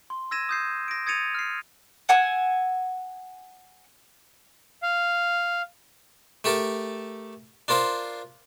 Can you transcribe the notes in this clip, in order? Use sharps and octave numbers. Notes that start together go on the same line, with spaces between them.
C6
E6 G#6 A#6 D#7 E7
D#6 G6 C7
A#6 D7
D#6 G#6 A6 C#7 D#7 F7
F6 C7
F#5 G#5 E6
F5
A3 G4 A4 A#4
D4 F4 A#4 C5